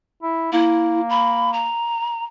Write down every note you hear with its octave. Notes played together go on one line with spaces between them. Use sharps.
E4
A#3 E4
B5
A#5